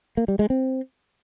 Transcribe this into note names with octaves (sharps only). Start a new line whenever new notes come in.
A#3
G3
G#3
C4